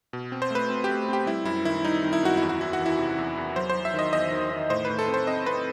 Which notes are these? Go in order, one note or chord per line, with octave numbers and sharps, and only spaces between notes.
B2
C4
C5
A3 B4
C4
A3 G4
C4 G4
G3 E4
F#2 E4
D#3 E4
G3 D#4
D#3
E4
F#2 F#4
E2 E4
F#4
E2 E4
F#4
E3
E4
C3
E2
E2
F#3 C5
C5
F#3
E5
D#3 D#5
E2 D#5
D#3
D#3
A2 C5
A2 B4
A4
C4
C5
C4 D#5
C4 B4